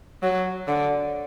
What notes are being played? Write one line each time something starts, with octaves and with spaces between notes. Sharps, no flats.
F#3
D3